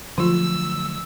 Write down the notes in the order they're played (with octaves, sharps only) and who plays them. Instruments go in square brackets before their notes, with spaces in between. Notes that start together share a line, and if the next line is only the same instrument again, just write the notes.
[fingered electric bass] D3 F#3 A3 [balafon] F3 F4 [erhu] E6